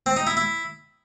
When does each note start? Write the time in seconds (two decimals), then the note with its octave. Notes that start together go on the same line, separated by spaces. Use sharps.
0.06 C4
0.17 D#4
0.27 E4
0.37 E4